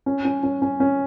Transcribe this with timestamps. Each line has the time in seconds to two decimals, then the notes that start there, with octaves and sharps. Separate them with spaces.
0.06 C#4
0.25 C#4
0.43 C#4
0.62 C#4
0.80 C#4